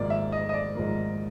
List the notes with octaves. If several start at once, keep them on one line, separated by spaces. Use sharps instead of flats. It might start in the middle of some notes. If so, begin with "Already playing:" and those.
Already playing: G#1 G#2 F3 A#3 D5
E5
D#5
D#5
D5
G#1 G#2 F3 A#3